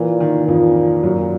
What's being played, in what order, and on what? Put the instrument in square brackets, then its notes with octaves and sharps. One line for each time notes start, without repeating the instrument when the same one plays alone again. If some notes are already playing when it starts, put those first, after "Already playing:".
Already playing: [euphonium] A#2 [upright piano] E3
[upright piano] D#3
[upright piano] F2 F3 [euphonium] A#2
[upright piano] F#2 F#3